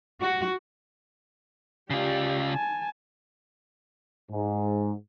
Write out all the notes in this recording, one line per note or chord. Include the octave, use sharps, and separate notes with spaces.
F#4
C#3 F4 G4 D5
G#5 A5
G#2